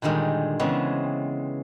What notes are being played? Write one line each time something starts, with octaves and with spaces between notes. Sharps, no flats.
A#2 D3 D#3 G3 G#3
C#3 E3 G#3 B3 C4